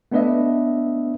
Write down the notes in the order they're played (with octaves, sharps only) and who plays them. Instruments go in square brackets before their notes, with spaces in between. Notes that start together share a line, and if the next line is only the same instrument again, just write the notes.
[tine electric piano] A3 B3 D4 B4 D#5 E5